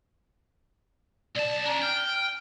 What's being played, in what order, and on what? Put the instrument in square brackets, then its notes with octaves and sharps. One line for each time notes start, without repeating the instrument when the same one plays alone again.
[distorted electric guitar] B1 A5 [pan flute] D5
[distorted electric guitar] C#4 D4 [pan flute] A#5
[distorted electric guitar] G5 [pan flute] F6